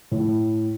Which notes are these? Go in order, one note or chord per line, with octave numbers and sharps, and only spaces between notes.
A2